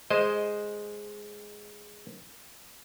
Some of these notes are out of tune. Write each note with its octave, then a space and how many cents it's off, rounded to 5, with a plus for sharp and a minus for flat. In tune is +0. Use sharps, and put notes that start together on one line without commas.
G#3 +0 C5 +0 D#5 +0